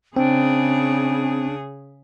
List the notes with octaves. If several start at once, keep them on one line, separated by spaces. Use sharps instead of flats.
C#3 C4 D4 G#4